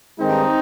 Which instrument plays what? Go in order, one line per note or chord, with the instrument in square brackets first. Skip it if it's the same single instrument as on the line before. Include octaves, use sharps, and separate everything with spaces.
[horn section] G2 D#3 G#3 C4 D#4